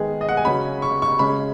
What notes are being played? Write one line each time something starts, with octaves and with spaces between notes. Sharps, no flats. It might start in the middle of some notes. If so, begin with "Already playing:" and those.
Already playing: D#3 G#3 B3 G#4
D#5
F#5
G#5
C#3 F#3 C#4 B5
C#6
C#6
C#3 G#3 C#4 B5